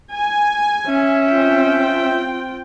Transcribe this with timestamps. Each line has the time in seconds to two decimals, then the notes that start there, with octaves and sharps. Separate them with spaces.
0.13 G#5
0.87 C#4 E5
1.30 C4 F4 G5